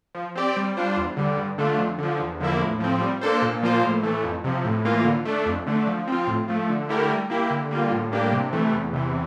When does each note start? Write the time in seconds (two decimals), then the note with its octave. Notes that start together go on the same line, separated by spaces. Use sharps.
0.15 F3
0.35 C4 G4 D5
0.57 G3
0.77 D4 F4 C5
0.97 E2
1.17 D3 G3
1.37 G2
1.58 D3 A3 D4 F4
1.78 F2
1.98 D3 F3
2.19 E2
2.40 D3 F3 A#3 E4
2.60 A2
2.80 F3 C4
3.01 G3
3.21 A#3 D4 A4 C5
3.42 A#2
3.63 F3 A#3 F4 C5
3.83 A2
4.03 E3 A3
4.23 F2
4.44 C3 F3
4.64 A2
4.85 E3 A#3 F4
5.05 D3
5.25 A3 D4
5.46 F2
5.67 D3 A3 D4
5.87 F3
6.08 C4 F4
6.27 A2
6.48 F3 A3
6.69 D3
6.89 A3 E4 G4 A#4
7.09 G3
7.30 A#3 E4 G4
7.50 D3
7.71 G3 A#3 F4
7.92 A2
8.12 G3 A#3 D4 G4
8.32 C3
8.53 E3 A3
8.73 E2
8.93 C3 E3